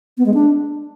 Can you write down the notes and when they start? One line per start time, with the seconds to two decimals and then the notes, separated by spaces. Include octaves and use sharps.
0.18 B3
0.26 G#3
0.34 D4